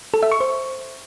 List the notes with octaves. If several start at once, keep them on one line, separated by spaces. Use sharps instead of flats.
A4
E5
C#6
C5